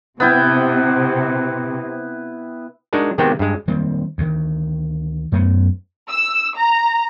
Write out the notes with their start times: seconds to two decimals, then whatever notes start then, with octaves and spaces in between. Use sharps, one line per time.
0.20 C3 B3 E4 G5
2.93 G#3 D4 D#4 F#4 G#4 A#4
3.18 C3 D#3 G#3 B3 C4 G4
3.39 G2 G#3
3.68 D#3 G3 A#3 C4
4.18 D2 D#3
5.32 F#2 A3 B3
6.08 E6
6.55 A#5